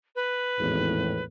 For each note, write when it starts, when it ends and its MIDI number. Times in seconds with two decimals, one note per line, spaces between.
0.16 1.24 71
0.59 1.23 32
0.59 1.23 40
0.59 1.23 45